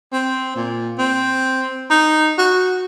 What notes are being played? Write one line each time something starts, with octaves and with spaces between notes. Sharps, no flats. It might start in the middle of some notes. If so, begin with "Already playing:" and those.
C4
A#2
C4
D#4
F#4